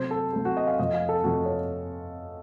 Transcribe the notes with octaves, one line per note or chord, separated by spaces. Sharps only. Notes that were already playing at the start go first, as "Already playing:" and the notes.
Already playing: C3 F#3 A3 C5
A4
C3 F#3 A3 A4
F#4
D#5
F5
F2 C3 F3 A3 D#5
F5
A4
F2 C3 F3 A3 F#4
C#5